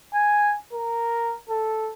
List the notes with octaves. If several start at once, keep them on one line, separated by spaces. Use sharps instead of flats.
G#5
A#4
A4